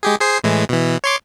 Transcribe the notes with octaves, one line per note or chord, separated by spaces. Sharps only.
G#3 G4 G#4
G#4 C5 C7
A2 E3 G#3
B2 E3
C#5 C6 D6